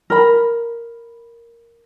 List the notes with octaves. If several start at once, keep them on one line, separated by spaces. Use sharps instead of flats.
A#4 B5